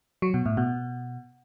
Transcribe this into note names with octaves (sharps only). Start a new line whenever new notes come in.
F#3
B2
A2
B2